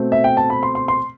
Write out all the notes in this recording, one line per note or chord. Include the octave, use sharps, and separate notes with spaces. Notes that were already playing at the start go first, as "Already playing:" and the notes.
Already playing: B2 A3 C4
E5
G5
A5
B5
C6
C6
C6